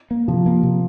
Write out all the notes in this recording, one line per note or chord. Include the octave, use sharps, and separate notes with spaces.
A#3
C3 F3
A#3
C3